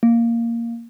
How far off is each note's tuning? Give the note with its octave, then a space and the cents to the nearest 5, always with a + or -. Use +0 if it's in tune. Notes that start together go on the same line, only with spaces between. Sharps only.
A#3 -5